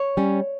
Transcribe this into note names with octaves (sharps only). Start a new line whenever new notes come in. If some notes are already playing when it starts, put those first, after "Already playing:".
Already playing: C#5
G3 C#4